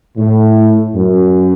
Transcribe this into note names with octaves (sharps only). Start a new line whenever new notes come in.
A2
F#2